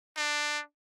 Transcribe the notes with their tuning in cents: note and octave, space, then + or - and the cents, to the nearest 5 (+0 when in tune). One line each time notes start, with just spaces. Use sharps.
D4 +15